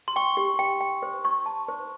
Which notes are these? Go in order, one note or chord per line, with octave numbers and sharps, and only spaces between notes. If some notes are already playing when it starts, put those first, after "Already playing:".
C6
G5 C#6
G4
G5
G5
C5
C#6
A5
C5